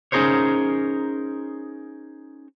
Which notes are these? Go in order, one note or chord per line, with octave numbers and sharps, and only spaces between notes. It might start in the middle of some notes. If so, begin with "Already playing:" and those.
C#4 D#4 G#4 A#4 C5 C#5